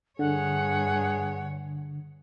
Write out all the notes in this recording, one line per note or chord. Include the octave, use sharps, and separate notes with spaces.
G2 D3 G#4 C#5 F#5